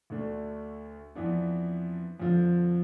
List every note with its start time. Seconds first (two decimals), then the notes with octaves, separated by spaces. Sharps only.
0.10 D2 D3 A3 D4
1.15 F2 E3 B3 D4
2.20 F2 D3 F3